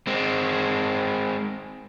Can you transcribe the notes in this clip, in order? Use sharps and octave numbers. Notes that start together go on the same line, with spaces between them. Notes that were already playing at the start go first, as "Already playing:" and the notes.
G#3 C4